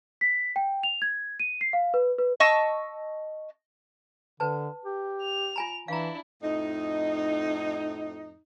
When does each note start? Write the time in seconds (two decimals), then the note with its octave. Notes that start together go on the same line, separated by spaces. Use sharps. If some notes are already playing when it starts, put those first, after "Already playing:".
0.21 B6
0.56 G5
0.83 F7
1.02 G#6
1.40 D#7
1.61 C7
1.73 F5
1.94 B4
2.19 B4
2.40 D#5 A5 C#6 E6
4.40 D3 B4 A5
4.85 G4
5.23 F7
5.56 F4 G#5 A#5
5.88 E3 D4 E4 F5 A#5
6.42 F2 A2 D#4